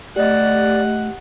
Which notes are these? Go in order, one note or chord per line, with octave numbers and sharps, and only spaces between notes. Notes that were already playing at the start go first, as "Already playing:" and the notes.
A3 G4 D5 D#5 F#5